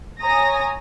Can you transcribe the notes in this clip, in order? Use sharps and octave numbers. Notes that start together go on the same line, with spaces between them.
C#5 G#5 A#5 D#6 A#6